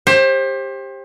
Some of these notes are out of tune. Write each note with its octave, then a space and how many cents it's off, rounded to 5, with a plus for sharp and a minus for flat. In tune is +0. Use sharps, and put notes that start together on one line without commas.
G4 +15 C5 +30